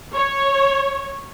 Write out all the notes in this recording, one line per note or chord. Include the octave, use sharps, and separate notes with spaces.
C#5